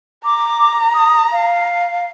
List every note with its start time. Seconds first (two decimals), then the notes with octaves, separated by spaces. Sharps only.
0.25 A#5 D6
0.94 D#6
1.32 F5